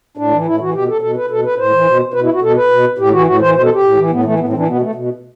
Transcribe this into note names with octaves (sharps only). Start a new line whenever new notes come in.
A2 D4
E3
A2 E4
E3 F#4
B2 G4
A4
B2 A4
B4
B2 A4
B4
A2 C5
E3
B2
B2 B4
E4
F#4
B2 A4
B4
B2
A2 G4
E3 F#4
A2 F#4
E3 C5
B2 C5
A4
G4
A2
E3
A2 B3
E3 A3
A2 B3
C4
E3 D4
B2 B3
A3
B2